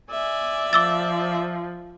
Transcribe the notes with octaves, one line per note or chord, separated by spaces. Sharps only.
D5 E5 G#5
F3 D6 E6 A6